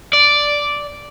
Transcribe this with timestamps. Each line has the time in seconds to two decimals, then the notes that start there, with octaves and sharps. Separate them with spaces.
0.13 D5